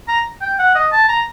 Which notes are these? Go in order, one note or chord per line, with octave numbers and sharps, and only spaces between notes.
A#5
G5
F#5
D#5
A5
A#5